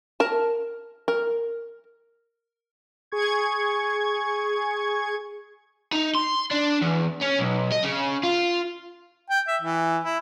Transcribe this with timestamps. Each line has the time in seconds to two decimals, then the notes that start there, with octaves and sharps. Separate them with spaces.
0.20 A#4 A5
1.08 A#4
3.12 G#4 C#6 G#6
5.93 D#4
6.15 C6
6.51 D4
6.82 E2
7.21 C#4
7.39 B1
7.72 D#5
7.83 C#3
8.23 F4
9.30 G5
9.47 E5
9.62 E3
10.04 E4